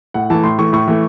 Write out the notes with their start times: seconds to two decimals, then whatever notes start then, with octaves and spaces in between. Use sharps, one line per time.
0.14 A2 F#5
0.30 E3 A3 A5
0.43 A2 C6
0.59 E3 A3 C#6
0.73 A2 C#6
0.88 E3 A3